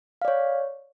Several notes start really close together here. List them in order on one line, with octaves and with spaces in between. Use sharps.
F5 D5 C#5